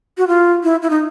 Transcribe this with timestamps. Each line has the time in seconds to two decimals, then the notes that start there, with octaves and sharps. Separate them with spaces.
0.18 F#4
0.28 F4
0.63 E4
0.82 E4
0.90 D#4